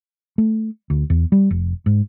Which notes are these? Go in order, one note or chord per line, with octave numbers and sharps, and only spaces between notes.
A3
D2
E2
G3
F1
G#2